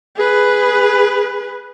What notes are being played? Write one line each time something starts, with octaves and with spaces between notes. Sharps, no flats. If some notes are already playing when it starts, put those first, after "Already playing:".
G#4 B4